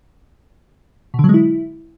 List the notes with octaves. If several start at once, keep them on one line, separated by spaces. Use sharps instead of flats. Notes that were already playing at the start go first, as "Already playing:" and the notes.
B2
D3
F#3
G#3
E4